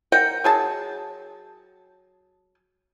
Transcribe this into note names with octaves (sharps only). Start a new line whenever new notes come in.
A#4 F#5 G5
F#3 G#4 A5